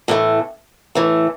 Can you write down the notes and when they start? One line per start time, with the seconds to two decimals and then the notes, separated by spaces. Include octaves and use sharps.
0.08 A2 E3 A3
0.95 A2 E3 A3